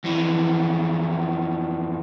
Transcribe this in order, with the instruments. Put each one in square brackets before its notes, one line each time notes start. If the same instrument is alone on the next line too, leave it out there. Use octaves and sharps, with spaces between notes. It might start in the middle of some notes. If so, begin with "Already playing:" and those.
[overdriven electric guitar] F2 E3